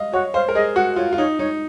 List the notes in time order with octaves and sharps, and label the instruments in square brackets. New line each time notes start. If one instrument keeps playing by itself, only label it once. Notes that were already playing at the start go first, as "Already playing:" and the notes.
Already playing: [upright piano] D#5 F5
[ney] F#4 [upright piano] C#5
[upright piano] C5 [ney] F5
[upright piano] A#4
[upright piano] G#4 [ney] D#5
[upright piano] F#4 [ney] F#5
[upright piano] F4 [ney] C#5
[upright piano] F4
[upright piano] D#4 [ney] C#5
[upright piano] D#4 [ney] C#5